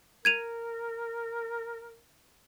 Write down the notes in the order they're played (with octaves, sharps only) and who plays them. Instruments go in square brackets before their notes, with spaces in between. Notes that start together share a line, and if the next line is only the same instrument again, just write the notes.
[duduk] A#4 [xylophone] G#6 D#7 F7